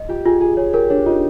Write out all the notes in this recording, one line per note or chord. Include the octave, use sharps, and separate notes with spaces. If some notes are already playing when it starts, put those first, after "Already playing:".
Already playing: D#5
F4 G4
F4 G#4
F4 G#4
G#4 C#5
G4 A#4
D4 C#5
D#4 F4